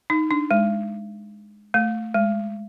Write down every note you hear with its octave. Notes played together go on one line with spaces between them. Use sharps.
D#4
D4
G#3
A3
G#3